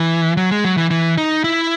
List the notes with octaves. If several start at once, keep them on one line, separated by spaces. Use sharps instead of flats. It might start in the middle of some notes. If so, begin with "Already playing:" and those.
Already playing: E3
F#3
G#3
F#3
E3
E3
D#4
E4